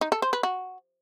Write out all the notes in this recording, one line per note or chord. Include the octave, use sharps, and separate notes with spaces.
D#4
A4
C5
B4
F#4